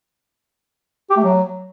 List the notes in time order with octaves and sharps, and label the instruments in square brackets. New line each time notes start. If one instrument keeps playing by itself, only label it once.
[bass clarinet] G4
A3
F#3